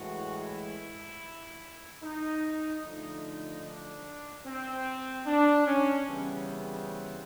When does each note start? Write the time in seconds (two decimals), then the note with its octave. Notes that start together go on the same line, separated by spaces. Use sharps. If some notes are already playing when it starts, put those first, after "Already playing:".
Already playing: A2 E3 G#3 F#4
0.42 E4
2.03 D#4
2.84 D3 F3 A3 D#4
3.64 D4
4.46 C4
5.26 D4
5.67 C#4
6.07 C#3 E3 G3 B3 C4